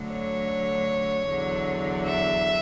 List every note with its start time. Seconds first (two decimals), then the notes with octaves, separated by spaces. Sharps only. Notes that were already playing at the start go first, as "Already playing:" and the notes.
Already playing: D2 D3 F#3
0.11 C#5
1.29 E2 D3 F#3
2.06 E5